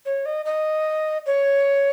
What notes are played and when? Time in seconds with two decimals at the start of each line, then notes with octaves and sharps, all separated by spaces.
0.06 C#5
0.26 D#5
0.45 D#5
1.26 C#5